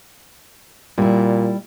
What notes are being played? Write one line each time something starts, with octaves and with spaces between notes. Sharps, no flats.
A#2 G3 E4